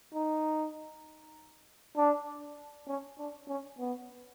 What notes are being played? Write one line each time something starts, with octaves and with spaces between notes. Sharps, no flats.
D#4
D4
C#4
D4
C#4
B3